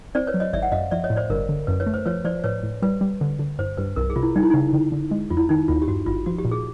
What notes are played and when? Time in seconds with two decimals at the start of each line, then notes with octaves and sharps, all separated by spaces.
0.15 C4 C5 D5
0.27 B4 C#5
0.34 F#3
0.40 C#5 D#5
0.53 G#1 D5 E5
0.62 F#5
0.72 F#2 D#5 F5
0.91 F3 D5 E5
1.04 C#5 D#5
1.10 A2
1.16 C5 D5
1.30 G1 A#4
1.49 D3
1.67 F#2 B4
1.80 B4 C#5
1.86 A3
1.94 C5
2.06 F3 B4 C#5
2.25 F3 C5 D5
2.44 A2 B4 C#5
2.63 A2
2.82 G3 B4
3.01 G3
3.21 D3
3.39 D3
3.59 G2 C5
3.77 G2 B4
3.96 C2 A#4
4.10 G#4
4.16 C3 F4
4.23 E4
4.36 G3 D#4
4.43 E4
4.50 C#3 D#4
4.73 D3
4.92 D3
5.11 G#3
5.30 F2 F4
5.37 E4
5.49 D#3 D#4
5.68 D#2 F4
5.82 G4
5.88 G2 F#4
6.06 G#1 F4
6.26 F3 F#4
6.38 G4
6.45 A#2
6.51 G#4